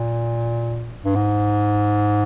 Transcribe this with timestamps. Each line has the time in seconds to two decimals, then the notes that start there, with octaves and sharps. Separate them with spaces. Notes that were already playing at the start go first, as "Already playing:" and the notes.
Already playing: A#2
1.05 G2
1.15 G#2